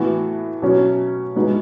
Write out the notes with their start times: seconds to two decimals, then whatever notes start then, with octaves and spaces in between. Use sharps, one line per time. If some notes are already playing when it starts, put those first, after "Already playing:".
Already playing: A2 E3 B3 F#4
0.62 B2 F#3 C#4
1.36 A2 G#3 B3 D#4 F#4